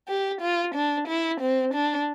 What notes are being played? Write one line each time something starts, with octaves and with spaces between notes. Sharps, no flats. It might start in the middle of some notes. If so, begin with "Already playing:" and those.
G4
F4
D4
E4
C4
D4